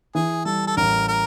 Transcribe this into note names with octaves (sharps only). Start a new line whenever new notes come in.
E3 G#4
G3 A4
A4
A1 A#4
A#4